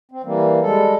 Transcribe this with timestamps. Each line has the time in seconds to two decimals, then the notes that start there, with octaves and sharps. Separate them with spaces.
0.12 C4
0.24 E3 G3 A#3
0.62 G3 G#3 A4